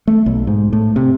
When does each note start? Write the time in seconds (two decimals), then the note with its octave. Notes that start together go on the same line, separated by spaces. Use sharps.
0.08 A3
0.26 B1
0.47 G#2
0.73 A2
0.96 C3